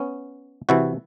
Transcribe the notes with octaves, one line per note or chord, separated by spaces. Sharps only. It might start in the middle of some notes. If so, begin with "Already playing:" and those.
Already playing: B3 C#4
C3 E3 E4 F#4